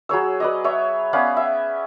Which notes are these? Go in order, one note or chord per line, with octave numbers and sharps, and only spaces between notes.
F#3 G#4 C#5 E6
B4 D5 D#5
C#5 E5
B3 C#4 D5 F5
E5